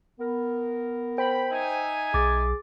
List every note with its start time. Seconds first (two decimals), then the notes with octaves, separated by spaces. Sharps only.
0.20 B3 A#4
1.18 C5 G5 B5
1.50 D#4 E5 G#5
2.14 B1 G#4 D6 A6